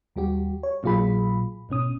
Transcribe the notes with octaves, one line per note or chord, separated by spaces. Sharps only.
D#2 G3 F#4 G4
C#5
A#1 A#2 F#3 F4 G#4 B5
G#1 B2 C#4 D#6